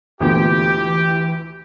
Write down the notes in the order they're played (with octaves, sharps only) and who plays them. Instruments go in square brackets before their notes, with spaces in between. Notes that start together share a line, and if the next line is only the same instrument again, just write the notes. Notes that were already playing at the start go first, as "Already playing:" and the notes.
[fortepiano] D2 A#2 B3 [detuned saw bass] E3 [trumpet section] G4